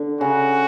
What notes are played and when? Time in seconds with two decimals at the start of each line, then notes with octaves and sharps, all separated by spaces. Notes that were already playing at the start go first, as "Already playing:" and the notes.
Already playing: D3
0.20 C#3 F#4